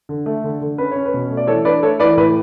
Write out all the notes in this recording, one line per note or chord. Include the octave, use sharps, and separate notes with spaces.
D3
A3
D3
D3
C#4 B4
C#4 C#5
B4
B2
A3
D5
E3 A4 C#5
D4 B4 D5
A3 A4 C#5
E3 B4 D5
A2 B4